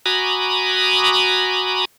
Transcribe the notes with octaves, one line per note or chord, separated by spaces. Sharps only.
F#4 G#5 A#5 B5 D6 D#6